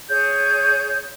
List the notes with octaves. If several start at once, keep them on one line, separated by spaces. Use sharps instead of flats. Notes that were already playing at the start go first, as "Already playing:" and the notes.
G#4 C#5 G6